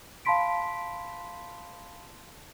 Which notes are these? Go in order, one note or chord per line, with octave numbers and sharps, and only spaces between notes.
F5 A5 B5 C6 B6 D7